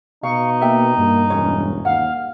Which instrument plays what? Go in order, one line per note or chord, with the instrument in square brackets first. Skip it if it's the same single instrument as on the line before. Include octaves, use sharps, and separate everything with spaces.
[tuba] B2 [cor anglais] D#4 [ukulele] F5 [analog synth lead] C#6
[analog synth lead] A#3 [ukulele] E5 G5
[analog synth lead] G2 [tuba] A#3
[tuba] E1 [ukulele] C#4 F4 C#5
[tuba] D#2 [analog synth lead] F5 [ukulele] F#5